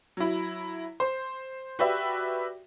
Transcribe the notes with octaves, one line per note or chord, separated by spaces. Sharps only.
F#3 E4
C5
F#4 G4 B4 D5 E5